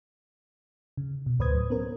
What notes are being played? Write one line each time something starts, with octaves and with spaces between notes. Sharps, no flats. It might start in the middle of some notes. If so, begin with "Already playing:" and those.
C#3
B2
D2 A2 B4 C5 D#6 G#6
F#3
B3 C#4 A#4 C5